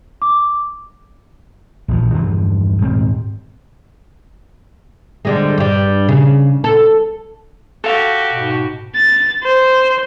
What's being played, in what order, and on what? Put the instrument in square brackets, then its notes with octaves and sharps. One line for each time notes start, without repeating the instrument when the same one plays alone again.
[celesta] D6
[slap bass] A#1 E2 F3
E2 G2 E3 F3
D#1 G#2 B3 C4
[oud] D3 G3 G#3
G2 G3
C#3
A4
[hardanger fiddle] F#4 G4 [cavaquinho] A4 F5 A5
[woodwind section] G#2 B2
[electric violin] A6
C5